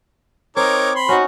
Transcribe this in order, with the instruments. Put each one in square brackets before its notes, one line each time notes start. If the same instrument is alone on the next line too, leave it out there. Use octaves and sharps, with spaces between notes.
[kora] C4 [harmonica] D#4 A#4 D6 [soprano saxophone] C#5
[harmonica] B5 C6
[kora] C#4 D#4 [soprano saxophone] F#4